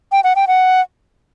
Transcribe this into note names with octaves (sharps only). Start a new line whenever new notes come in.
G5
F#5
G5
F#5